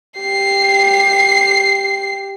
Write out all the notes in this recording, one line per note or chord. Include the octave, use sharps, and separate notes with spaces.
G4 C7